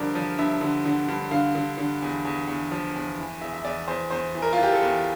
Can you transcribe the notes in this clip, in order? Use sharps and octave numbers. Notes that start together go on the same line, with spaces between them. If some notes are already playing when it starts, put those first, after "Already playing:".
Already playing: G2 D3 F3 A#4 D5
F3
G2 E5
D3
D3
G2
D3 F5
D3
D3
E2
E2
E2
F3
E2
E3
E2 E5
E5
E2 D5
E2 C5
E2 C5
E3
A#4
F4
E3
G4
A4
E2